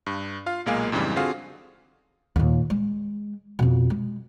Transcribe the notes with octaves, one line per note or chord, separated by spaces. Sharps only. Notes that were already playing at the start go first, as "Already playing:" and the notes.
G2
F4 F5
B1 A#2 G#3 A#3 F5 G#5
F2 G#2 C#3 E3 G3
D3 C4 F4 F#4 G#4 F5
D#2 A#2
G#3
F2 B2
G#3